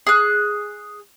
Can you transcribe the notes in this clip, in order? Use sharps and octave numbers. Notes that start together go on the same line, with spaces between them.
G#4 F#6